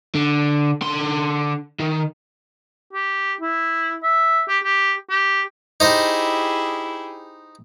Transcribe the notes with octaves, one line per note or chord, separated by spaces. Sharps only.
D3
D3 C6
D#3
G4
E4
E5
G4
G4
G4
D#4 E4 G4 G#4 C5 D#5